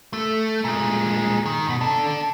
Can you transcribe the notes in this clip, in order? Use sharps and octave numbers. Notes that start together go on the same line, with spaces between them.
A3
A#2 G#3
D#3
E2 B2
D4 A4